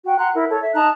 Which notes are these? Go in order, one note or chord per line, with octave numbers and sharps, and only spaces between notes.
F#4 G5
F#5 A#5 C6 F#6
E4 A#4
A4 C#5
E5
D#4 A5 A#5 F#6